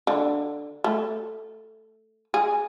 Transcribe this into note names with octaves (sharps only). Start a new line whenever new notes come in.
D3
A3
G#4